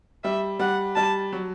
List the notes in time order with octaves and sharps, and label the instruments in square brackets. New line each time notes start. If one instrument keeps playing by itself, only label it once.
[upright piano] G3 [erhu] E5
[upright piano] G3 [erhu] F#5
[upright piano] G3 [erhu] A5
[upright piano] F#3